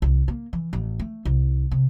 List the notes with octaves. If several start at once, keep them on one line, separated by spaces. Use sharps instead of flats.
C2
A#3
E3
A1
A3
C2
C3